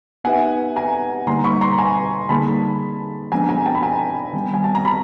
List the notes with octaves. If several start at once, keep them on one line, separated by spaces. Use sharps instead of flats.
B3 D#4 G4 B4 E5 F#5 G#5
G#5 A#5
D3 G3 A#3 D#4 A#5 C6
B5 C#6
A#5 C6
G#5 A#5
D3 G3 A#3 D#4 G#4 A5 B5
F3 G#3 B3 D4 G#5 A#5
G#5 A#5
G5 A5
B5
G#5 A#5
D#3 G3 B3
G#5
A5
A#5
A5 B5